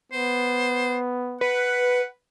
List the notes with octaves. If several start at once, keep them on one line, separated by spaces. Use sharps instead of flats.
B3 C5
B4 F#5